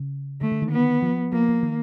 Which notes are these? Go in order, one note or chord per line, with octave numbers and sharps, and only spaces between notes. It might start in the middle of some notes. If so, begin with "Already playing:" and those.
Already playing: C#3
D3 A3
D3
D#3
B3
F3
F3 A#3
F3
D#3